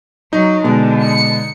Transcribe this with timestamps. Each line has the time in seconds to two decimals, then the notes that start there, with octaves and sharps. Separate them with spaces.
0.33 F#3 D#4
0.64 B2 D3 G#3
1.04 C#7